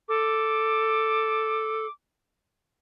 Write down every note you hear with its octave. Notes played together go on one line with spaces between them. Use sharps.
A4 D6